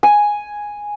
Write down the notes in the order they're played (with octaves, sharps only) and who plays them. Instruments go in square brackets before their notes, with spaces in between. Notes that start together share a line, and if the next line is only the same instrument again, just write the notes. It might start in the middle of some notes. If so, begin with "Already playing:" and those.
[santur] G#5